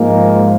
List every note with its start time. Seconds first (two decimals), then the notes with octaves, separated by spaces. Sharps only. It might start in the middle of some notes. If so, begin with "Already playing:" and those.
Already playing: G#2 F3 G#3 A#3